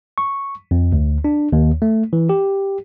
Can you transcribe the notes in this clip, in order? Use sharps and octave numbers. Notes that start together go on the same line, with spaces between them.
C#6
F2
D2
D4
D#2
A3
E3
G4